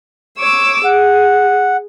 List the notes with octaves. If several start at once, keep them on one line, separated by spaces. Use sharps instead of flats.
C#5 D6 E6
G#4 F#5